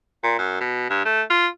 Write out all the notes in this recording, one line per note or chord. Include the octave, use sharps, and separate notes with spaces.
A#2
F#2
B2
G2
A3
F4